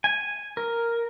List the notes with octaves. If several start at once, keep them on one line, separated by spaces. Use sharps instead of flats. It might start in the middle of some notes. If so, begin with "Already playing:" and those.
G#5
A#4